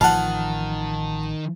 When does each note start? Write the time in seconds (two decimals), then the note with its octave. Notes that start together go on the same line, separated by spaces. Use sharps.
0.01 A1 D#3 F3 F5 F#5 A5